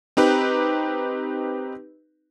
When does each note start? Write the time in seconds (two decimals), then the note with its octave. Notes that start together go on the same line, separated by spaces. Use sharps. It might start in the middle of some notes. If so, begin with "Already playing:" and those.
0.17 C4 D#4 G4 B4